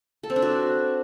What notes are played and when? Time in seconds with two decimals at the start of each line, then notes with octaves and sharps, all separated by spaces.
0.23 A4
0.30 C4
0.36 D4
0.42 F#4